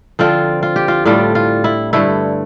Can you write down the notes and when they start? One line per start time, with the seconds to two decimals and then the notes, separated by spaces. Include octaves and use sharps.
0.19 D3 F3 C4 F4
0.63 F4
0.76 G4
0.88 F4
1.06 A2 G3 D4 F4
1.35 F4
1.64 E4
1.93 G2 D3 A3 E4